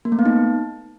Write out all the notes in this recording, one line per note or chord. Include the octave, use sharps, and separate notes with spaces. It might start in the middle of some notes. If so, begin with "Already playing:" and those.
A#3
A3
B3
D#4